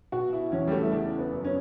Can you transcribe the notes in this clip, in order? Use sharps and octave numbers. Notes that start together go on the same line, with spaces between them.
B2 F#4
E4
E2 C#4
G3
A3
E4
C#3 D4
B3
F#2
C#4